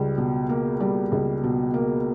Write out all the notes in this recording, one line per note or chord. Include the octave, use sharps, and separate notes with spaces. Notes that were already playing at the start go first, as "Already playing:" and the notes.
Already playing: C#2 G3
B2
A#3
G3
C#2
B2
A#3